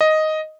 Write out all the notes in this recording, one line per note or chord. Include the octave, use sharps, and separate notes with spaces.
D#5